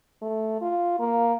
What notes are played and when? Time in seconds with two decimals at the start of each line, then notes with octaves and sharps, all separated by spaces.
0.22 A3
0.61 F4
0.99 A#3